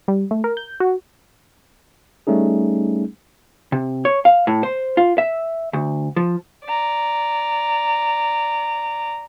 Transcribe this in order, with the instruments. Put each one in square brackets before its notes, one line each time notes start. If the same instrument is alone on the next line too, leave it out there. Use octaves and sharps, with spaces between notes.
[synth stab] G3
A3
A#4
G6
F#4
[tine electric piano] G3 A3 C#4 D#4 G#4
[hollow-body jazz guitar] C3
C#5
F5
A2
C5
F4
E5
D2
F3
[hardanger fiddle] D5 A#5